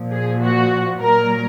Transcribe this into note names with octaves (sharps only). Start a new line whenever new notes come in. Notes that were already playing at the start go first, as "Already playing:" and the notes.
Already playing: A#2 F3
G#4
F#4
A#2 F#3 A#4